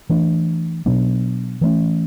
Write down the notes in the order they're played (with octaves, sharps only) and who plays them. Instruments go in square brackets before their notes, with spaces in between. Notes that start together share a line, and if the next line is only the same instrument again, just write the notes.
[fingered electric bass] E3 A3 D4
B2 F#3 B3 D4
E3 A3 C#4